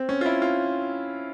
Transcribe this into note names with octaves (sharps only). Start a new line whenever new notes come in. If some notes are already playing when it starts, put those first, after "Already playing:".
Already playing: C4
C#4
F4
E4
F4